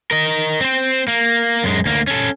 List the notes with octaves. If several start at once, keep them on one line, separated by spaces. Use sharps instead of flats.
A#4 D#5
C4 C5
A#3
F#2 G#3
D2 A#3
C#4 A4